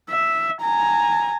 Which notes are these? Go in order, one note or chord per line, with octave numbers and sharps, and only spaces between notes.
E5
G#5 A#5